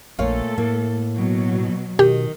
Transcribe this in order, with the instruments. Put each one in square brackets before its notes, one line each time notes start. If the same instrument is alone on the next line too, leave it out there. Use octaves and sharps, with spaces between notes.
[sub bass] A#1 [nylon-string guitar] A#2 C#5 F5 [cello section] A3 A4
[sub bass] A2 [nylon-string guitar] A#3
[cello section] B2 F#3
[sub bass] B2 [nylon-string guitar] D#3 [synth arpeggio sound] G4